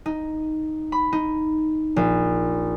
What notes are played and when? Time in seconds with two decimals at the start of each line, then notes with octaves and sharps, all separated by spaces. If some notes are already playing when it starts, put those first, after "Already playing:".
0.06 D#4
0.92 B5
1.13 D#4
1.96 A#1